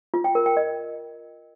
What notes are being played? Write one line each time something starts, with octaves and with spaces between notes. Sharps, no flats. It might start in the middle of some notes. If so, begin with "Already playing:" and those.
F4
G5
A#4
G5
D#5